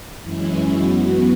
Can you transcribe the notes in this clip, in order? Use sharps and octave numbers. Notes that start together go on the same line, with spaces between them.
F#2 E3 G#3 C#4 E4
F#2 E3 B3 F#4